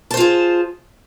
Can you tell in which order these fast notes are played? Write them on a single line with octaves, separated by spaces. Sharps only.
A5 C5 F4 G#4